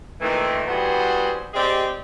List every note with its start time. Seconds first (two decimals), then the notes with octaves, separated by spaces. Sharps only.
0.21 A#2 D#3 E3 A3 C4
0.68 E3 G3 B3 F#4 G#4 C5
1.54 C4 G4 G#4 D5 D#5 G5